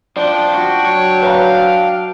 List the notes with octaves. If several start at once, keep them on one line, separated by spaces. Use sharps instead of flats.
F3 D4 D5 G5
F#4
F#3 C#5
B4 C#5 F5 A#5